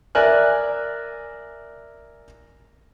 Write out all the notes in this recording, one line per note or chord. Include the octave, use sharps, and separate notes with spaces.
A#4 D5 E5 G#5 F#6